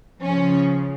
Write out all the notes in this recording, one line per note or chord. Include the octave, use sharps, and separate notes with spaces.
C#3 F3 C#4